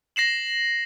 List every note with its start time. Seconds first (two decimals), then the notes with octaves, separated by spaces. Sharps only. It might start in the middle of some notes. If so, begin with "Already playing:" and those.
0.16 A#6 C7 E7 F#7